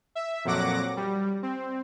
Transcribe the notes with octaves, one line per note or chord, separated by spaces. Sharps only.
E5
F2 A#2 F#3 F#5 D6 A#6
G3
C4